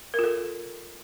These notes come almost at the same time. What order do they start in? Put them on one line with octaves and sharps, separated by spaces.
A#4 F4 A4